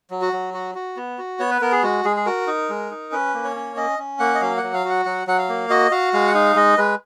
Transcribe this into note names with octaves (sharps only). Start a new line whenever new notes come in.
F#3
F#4
F#3
F#4
F#4
B3
F#4
B3 C#5
B4
B3 A#4
G#4
G#3 F#4
G#3 G#4
G#4
F#4 A#4
D#4
G#3
D#4
C#4 B4
A#3
C#5
C#4
C#4 D#5
C#4
A#3 F#5
D#5
F#3 F5
F#5
F#3
F5
F#4 F#5
F#3 F#5
F#3 F#5
F5
A#3
F#4 D#5
F#4 F5
G#3 F5
F#5
D#4 F5
G#3 D#5
G#3 B4